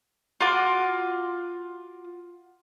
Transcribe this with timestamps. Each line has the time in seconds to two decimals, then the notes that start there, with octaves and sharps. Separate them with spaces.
0.40 F4 F#4 C6 D6